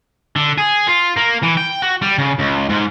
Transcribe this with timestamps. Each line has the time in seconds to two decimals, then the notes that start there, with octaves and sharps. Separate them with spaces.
0.36 D3
0.58 G#4
0.88 F4
1.17 A#3
1.43 E3
1.57 G5
1.82 F#4
2.02 G3
2.18 C#3
2.39 C#2
2.70 G#2